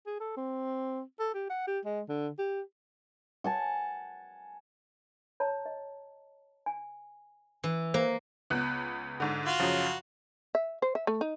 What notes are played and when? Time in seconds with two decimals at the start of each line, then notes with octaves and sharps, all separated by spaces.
0.06 G#4
0.20 A4
0.37 C4
1.20 A4
1.34 G4
1.50 F#5
1.67 G4
1.85 G#3
2.09 D3
2.39 G4
3.44 F#5 G#5 A5
5.40 C#5 A5 A#5
5.66 D#5
6.66 G#5
7.64 E3
7.94 A#3 C5
8.50 C#2 B3 F#6
9.20 G#2 D3
9.46 F4 F#4 F5
9.60 F#2 C#3 F3
10.55 E5
10.82 C5
10.95 E5
11.07 A3
11.21 D#4